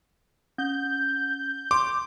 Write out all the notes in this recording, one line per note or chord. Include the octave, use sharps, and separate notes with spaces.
C#4 G6
C6 D6